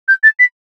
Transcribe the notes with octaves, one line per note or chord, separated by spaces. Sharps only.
G6
A6
B6